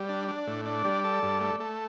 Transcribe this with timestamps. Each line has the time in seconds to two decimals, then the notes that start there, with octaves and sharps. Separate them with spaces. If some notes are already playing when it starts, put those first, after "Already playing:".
Already playing: G3 D5
0.09 D4
0.28 D4
0.47 A2
0.65 D4 D5
0.85 G3
1.04 A4
1.23 G2
1.41 A3
1.60 A3